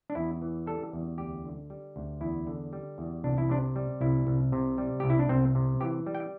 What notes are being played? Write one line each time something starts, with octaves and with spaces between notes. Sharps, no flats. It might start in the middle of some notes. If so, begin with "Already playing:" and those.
D4
E2 E4
E3
G3 A4
E2
D2 G4
D3
G3
D2
E2 E4
D3
G3
E2
C2 D4
E4
C3 D4
G3
C2 E4
C2
C3
G3
C2 G4
E4
D4
C2 C4
C3
E3 G4
G3
G5